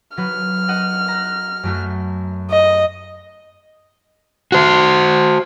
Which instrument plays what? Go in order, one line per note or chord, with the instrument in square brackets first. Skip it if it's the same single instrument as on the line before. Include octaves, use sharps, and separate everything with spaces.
[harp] F#3 B4 [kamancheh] F6
[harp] D#5 F#5 D#7
A#5 F#6
F#2 A3 F#4
[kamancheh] D#5
[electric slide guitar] F#4 C5